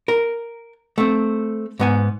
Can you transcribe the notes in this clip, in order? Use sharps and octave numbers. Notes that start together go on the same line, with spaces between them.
A#4
A3 C4
G#2 B3 G#5